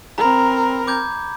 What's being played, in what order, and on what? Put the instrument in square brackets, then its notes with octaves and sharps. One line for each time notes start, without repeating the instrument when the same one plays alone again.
[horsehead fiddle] C4 A#4 [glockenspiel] A#5 B5
[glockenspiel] D6 G6 G#6